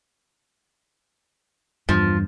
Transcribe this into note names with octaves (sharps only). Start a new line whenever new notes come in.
E2 G2 F3